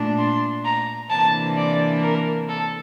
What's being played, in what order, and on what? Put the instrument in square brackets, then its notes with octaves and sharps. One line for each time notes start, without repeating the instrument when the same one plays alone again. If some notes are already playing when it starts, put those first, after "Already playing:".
Already playing: [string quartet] A#2 A3 D4
C6
A#5
C3 E3 A#3 D4 A5
D5
A#4
A4